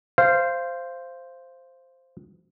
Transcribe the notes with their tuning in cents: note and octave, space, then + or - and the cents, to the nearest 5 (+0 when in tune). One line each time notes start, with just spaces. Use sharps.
C5 +0 F5 -20